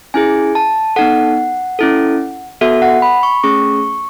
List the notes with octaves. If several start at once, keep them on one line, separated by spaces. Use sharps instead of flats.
C#4 E4 G#4 G#5
A5
B3 D#4 A4 F#5
C#4 E4 A4
B3 F#4 A4 E5
F#5
B5
C#6
A3 C#4 G#4 C#6